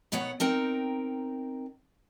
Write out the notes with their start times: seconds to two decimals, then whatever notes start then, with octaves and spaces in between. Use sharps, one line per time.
0.12 B2 D#3 B3 C#5 F#5
0.40 C4 D#4 A#4 G5